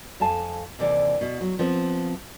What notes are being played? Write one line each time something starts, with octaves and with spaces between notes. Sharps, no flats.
F2 F5 G#5 A5
D#2 C3 E3 D5
B2
F#3
F3 B3 C4